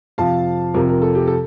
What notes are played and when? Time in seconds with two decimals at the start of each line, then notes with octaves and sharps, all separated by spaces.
0.18 F2 C3 F3 F5 A5
0.74 F2 C3 F3 G4 A#4
0.89 A#4
1.02 A4
1.15 G4
1.27 A4